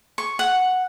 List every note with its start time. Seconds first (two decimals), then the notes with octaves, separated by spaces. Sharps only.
0.18 C#6
0.39 F#5